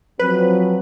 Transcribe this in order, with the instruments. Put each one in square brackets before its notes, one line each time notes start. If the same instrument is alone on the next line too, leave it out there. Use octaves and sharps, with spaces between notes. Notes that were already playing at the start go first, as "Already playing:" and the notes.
[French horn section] F3 F#3 C4 [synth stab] B4